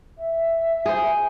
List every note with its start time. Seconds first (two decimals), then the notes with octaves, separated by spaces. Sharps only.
0.17 E5
0.86 G#4 C5